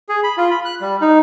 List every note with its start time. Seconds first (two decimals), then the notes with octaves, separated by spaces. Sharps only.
0.09 G#4
0.24 B5
0.37 F4
0.51 B5
0.65 F#6
0.81 G3
1.01 D#4